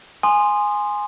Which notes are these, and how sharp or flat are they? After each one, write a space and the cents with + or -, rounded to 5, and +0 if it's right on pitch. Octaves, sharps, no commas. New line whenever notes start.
G#5 +0 C6 +0 D#6 -25